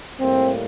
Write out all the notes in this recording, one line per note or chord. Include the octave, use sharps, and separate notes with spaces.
A2 G3 A#3 C4